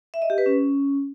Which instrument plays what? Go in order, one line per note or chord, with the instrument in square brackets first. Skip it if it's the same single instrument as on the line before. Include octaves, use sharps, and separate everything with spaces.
[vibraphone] E5
D#5
G4
B4
C#4